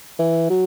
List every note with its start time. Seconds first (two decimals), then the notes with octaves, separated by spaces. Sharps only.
0.19 E3
0.50 F#3